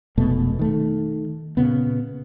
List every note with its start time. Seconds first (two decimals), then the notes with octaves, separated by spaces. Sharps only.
0.18 F1 B2 G#3 A3
0.59 D#3 A3
1.57 A#2 C#3 B3